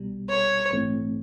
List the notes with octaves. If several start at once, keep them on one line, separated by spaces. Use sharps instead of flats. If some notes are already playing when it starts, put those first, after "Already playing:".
Already playing: B1 B2 G3
C#5
A#1 G#2 E3 A3 C4